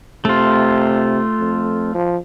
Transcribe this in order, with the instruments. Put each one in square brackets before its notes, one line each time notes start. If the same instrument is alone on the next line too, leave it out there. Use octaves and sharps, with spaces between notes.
[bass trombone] C3 [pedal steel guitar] A3 F4
[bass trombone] F2
F3